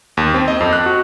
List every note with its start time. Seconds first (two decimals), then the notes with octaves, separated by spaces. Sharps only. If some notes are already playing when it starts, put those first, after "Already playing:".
0.17 D#2
0.34 C4
0.48 D#5
0.61 F2
0.73 F#6
0.86 F#4